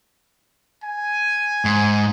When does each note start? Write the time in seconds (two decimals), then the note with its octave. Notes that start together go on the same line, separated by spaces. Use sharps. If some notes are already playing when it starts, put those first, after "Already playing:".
0.84 G#5
1.65 G#2